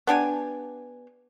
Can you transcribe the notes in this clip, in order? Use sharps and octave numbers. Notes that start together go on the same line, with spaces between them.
B3 D4 G4 G#5